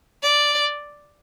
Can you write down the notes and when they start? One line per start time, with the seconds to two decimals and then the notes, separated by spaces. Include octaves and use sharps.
0.23 D5